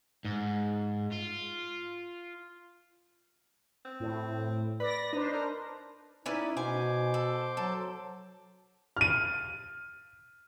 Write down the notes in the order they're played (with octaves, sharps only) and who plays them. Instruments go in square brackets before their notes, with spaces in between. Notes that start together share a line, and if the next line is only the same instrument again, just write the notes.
[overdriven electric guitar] G#2
F4
[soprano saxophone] C4
[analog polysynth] A2
[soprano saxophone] B4 [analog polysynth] D5 A#6
[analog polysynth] D4 B4 C5 [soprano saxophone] D#4
[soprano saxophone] A#4
[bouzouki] C#4 E4 B4 [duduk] D#4 [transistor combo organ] D5
[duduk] B2 [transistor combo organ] C5 D6 [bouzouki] G#5
[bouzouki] A4
[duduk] F#3 [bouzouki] A4
[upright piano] F6 D#7